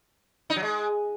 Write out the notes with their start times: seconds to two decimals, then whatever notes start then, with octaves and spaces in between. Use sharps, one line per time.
0.50 D#4
0.56 F#3
0.63 G#3